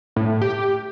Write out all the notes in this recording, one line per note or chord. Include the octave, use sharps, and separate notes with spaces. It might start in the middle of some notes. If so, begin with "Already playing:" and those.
A2
G4